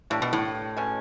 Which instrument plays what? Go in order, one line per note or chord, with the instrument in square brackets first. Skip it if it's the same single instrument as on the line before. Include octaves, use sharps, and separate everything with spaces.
[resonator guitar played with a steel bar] A2 [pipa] A#3 D4 G4
[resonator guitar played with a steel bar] B2
A2
[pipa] B2 G#3 C#4